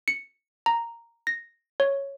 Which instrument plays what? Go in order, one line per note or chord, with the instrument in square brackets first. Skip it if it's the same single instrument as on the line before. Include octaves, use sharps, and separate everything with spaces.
[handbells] C#7
A#5
A#6
C#5